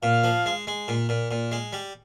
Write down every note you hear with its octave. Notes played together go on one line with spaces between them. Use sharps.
A#2 F5
F3
G#3
G#3
A#2
A#2
A#2
G#3
G3